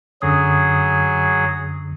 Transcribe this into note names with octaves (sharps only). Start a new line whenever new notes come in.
F#2 D3 F#3 G#4 D#6